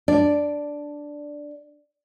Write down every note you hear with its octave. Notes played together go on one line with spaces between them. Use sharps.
D4 D5